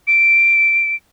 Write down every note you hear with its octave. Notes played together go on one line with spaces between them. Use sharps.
D7